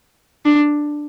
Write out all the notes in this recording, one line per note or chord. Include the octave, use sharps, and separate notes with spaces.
D4